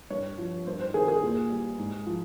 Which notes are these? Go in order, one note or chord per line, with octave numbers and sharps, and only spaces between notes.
G2 C#5
F3
G2 C5
C5
D#3 G3 G#4
G#4
A#2
G3
G#2
F3